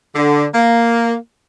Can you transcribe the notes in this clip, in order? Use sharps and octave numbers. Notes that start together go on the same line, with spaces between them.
D3
A#3